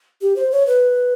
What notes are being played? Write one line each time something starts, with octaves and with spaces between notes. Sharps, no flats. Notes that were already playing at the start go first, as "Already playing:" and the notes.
G4
C5
C#5
B4